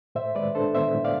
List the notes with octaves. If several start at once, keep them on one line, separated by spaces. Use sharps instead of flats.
A2 C5 E5
G#3 B4 D5
D4 A4 C5
B3 C5 E5
A2
D5 F5